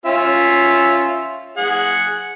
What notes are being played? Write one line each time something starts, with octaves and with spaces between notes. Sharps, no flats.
C#4 F4 E5
G#4 F#5